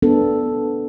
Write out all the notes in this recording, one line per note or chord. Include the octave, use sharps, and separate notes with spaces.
B3 D4 A4